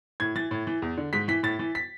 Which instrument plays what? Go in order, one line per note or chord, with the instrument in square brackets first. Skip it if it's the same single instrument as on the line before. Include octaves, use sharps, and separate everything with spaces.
[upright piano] A2 G#6
E3 A6
A2
E3
E2
D3
G#2 B6
E3 B6
A2 A6
E3
B6